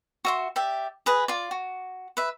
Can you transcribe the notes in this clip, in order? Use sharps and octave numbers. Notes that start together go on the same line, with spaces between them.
F#4 E5 C6
G4 D5 E5
G#4 B4 D#5
F4 D5
F#4
B4 E5